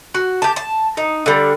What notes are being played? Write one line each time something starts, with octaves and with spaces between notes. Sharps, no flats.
F#4
G4 A5
A5
D#4
D3 G3